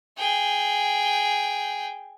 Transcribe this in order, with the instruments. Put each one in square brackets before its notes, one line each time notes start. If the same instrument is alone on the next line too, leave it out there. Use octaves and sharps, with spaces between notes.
[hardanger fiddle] G#4 G5